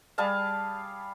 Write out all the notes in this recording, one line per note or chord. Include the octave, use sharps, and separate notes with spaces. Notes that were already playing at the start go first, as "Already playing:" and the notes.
G3 G#4 F5 A5